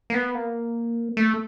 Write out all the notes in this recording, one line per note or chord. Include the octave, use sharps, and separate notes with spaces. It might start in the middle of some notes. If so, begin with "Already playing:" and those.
A#3
B3
A#3
A3